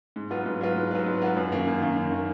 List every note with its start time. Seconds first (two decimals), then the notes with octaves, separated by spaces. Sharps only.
0.16 G#2
0.30 F#3 B3 F4 B4
0.46 G#2
0.61 F#3 B3 F4 B4
0.76 G#2
0.91 F#3 B3 F4 B4
1.06 G#2
1.22 F#3 B3 F4 B4
1.37 F#2
1.52 D#3 A#3
1.66 F#2
1.82 D#3 A#3
1.97 F#2
2.12 D#3 A#3